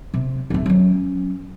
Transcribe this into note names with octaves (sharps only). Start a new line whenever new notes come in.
C3
D1 A3
F#3 C#4